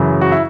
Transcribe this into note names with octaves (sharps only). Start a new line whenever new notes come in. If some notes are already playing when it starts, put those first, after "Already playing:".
Already playing: F#2 C#3 E3
F#4
E4